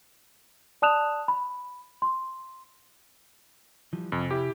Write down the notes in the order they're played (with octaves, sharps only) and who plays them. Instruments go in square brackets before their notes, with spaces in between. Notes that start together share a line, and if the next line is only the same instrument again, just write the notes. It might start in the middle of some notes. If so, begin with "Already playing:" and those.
[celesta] D5 A5 D#6 F#6 E7 F7
B5
C6
[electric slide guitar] E3 F3 G3
[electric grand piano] F2 [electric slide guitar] C3 G#5
[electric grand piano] E4 G4